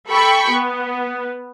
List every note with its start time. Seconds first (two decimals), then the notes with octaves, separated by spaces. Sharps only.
0.10 A4 G5 B5 C#6
0.52 B3